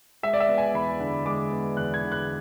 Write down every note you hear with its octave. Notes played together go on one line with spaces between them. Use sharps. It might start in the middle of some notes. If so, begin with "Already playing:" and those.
G#3 E5
D5
E5
B3
G#5
E2 B5
D3
G#3 D6
B3
E2 F#6
G#6
D3
F#6